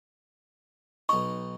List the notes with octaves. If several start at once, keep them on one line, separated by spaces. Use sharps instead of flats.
B1 D#4 C#6